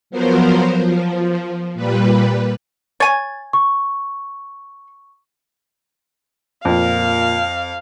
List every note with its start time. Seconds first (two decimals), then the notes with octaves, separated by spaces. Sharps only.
0.10 F3 F#3 B3 A#4 C5
0.80 F3
1.74 A#2 G3 B4
3.00 C#5 G#5 A6
3.53 C#6
6.65 F2 A#2 F5